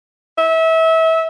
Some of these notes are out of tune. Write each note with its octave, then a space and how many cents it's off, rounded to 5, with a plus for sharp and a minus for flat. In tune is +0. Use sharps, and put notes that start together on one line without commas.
E5 -30